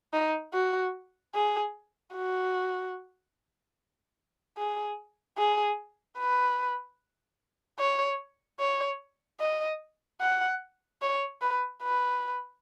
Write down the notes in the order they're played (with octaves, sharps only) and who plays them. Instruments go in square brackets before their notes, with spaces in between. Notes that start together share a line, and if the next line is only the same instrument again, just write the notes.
[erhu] D#4
F#4
G#4
F#4
G#4
G#4
B4
C#5
C#5
D#5
F#5
C#5
B4
B4